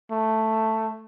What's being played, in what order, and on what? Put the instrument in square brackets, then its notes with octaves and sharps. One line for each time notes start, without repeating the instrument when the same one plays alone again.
[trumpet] A3